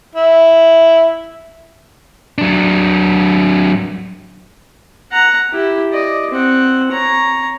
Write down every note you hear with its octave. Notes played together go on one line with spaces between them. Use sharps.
E4
F#3 D4
F#5 A#5
E4 G4
D5 D#5
C4 F#5
C#5 A#5